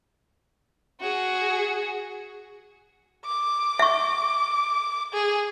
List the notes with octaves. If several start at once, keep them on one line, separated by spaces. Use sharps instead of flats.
F#4 G#4
D6
E5 C#6
G#4